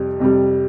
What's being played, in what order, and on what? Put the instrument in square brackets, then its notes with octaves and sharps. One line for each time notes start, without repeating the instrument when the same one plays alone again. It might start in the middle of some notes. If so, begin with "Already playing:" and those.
Already playing: [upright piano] F2 C3 G3
F2 C3 G3